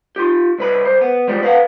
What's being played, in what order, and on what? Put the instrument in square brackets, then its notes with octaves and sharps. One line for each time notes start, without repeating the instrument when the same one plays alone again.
[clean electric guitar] F4 G4
C2 B4 B5
C2 C5
B3
E3 F3 G3 G#3
B4 F5 F#5